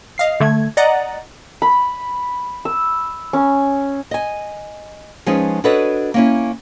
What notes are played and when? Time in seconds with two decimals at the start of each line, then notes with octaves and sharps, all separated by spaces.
0.18 D#5 F5 C7
0.40 D3 A3 G#6
0.77 D5 D#5 F#5 A#5 A6
1.62 B5
2.65 E6
3.33 C#4
4.11 D#5 G#5
5.26 F3 G#3 C#4 D#4 G#4 B4
5.64 D4 F#4 A4 B4 C#5 D#5
6.14 A#3 C#4 E4